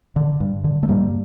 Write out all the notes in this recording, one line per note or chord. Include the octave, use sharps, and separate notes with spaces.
D3
G2
D3
A3
G2 G3 A#3